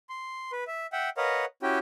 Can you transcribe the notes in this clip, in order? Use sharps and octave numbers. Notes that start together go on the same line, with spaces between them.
C6
B4
E5
E5 F#5 G5
A#4 B4 C#5 D#5 F5 F#5
C#4 E4 F#4 G4 G5